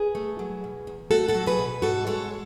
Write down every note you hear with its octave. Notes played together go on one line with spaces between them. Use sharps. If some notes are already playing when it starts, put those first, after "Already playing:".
Already playing: G#4 B4
A3
F#3
B2
E2
A3 F#4 A4
F#4 A4
F#3
G#4 B4
B2
G#2 F#4 A4
G#3 A4 C#5